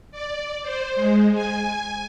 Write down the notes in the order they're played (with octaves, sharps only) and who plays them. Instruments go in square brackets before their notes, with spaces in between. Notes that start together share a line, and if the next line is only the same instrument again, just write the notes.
[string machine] D5
C5
G#3
G#5